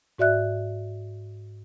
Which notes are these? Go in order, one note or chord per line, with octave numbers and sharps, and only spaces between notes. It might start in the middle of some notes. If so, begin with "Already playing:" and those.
G#2 F#4 D5 E5 F#6